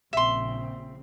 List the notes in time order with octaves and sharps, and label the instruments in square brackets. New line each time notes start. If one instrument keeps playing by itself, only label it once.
[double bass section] A#1 C#3 C4 [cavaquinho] E5 C6